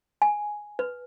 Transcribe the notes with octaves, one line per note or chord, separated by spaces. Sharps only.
G#5
B4